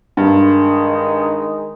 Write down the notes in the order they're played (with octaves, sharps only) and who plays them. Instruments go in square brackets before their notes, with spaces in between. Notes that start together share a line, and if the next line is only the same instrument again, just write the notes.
[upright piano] G2 [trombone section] D#3 G#3 D#4